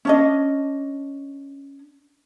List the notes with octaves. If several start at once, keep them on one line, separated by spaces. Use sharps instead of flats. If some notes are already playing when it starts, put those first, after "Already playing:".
C#4 D4 D#5